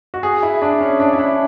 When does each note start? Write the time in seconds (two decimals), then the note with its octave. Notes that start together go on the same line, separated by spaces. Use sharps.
0.14 F#4
0.23 G#4
0.43 E4
0.62 D4
0.80 C#4
1.00 D4
1.13 E4
1.19 D4